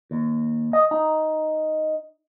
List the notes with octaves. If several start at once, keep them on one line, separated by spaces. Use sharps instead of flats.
D#2
D#5
D#4